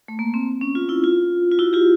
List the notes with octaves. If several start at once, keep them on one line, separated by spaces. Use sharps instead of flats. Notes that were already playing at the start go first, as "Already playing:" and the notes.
A3
A#3
C4
C#4
F4
E4
F4
F4
E4 F#4
F4 G4